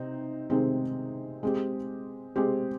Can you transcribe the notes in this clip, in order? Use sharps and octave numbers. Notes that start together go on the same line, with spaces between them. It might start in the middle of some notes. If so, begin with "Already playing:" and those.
Already playing: C3 C4 D#4
C3 D#3 G#3 C4 D#4
G#3 C4 G4
G#3 C4 G4